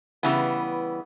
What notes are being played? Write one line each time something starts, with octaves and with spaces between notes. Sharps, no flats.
C#3 E3 G3 B3